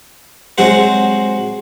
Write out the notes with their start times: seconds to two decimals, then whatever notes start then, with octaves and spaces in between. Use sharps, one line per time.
0.58 F#3 G#3 C4 F#4 C5